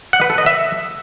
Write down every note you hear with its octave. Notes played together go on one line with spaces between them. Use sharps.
F#5
B4
A4
D#5
E5